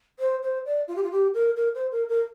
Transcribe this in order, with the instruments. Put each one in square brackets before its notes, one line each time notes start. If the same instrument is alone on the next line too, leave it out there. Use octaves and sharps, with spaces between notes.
[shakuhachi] C5
C5
D5
F4
G4
F4
G4
A#4
A#4
C5
A#4
A#4